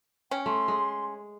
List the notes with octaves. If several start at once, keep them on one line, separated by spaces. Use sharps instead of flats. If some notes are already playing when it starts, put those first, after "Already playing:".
C#4 G5
A3 C6
G#3